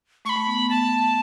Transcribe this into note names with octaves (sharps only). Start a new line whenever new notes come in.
A3 C#6
B5
A3
B3
B3
A3 A5